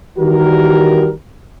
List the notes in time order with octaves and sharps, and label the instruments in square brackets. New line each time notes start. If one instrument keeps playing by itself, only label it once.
[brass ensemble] D#3 E3 G3 F#4 G4 A#4